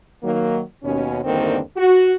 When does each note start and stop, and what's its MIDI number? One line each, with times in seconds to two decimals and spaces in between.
0.23 0.61 51
0.23 0.61 54
0.23 0.61 58
0.83 1.20 39
0.83 1.20 47
0.83 1.20 61
1.24 1.59 40
1.24 1.59 43
1.24 1.59 50
1.24 1.59 51
1.24 1.59 58
1.24 1.59 60
1.77 2.15 66